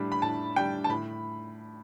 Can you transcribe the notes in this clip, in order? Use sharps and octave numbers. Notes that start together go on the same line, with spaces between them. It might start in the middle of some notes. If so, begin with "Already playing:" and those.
Already playing: A2 G3 D4 B5
B5
A2 A5
G3 D4 G5
A5
A2 B5